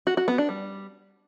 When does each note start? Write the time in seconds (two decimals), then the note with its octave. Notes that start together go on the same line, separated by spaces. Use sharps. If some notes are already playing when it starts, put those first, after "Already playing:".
0.07 F#4
0.17 F#4
0.28 B3
0.38 D4
0.49 G3